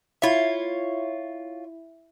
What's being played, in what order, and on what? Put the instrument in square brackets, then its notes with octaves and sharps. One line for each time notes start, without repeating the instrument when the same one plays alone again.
[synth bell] E4 E5 [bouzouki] F4 C#5